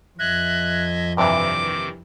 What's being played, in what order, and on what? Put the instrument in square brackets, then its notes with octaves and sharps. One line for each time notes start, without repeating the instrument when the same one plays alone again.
[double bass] F2 [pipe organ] D#5 E5 G#6 [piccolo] F#6
[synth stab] G2 C3 E3 [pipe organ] D#3 C4 [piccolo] D6